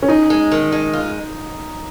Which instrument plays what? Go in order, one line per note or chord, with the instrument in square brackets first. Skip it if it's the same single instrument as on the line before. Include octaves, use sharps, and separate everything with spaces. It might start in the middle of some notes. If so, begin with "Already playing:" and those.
[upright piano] C#4
[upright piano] D#4 [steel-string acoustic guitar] G#4
[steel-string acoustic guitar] G#3
D#3
G#3
F4